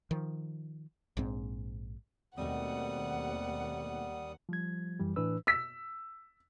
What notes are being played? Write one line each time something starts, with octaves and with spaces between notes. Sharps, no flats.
D#3 F3
A#1 G#2 C4
D#2 B2 G3 A3 C4 F#5 D#6
F3 G3 G#6
F#2 E3 G3
A2 E3 D4 B4 E6
E6 B6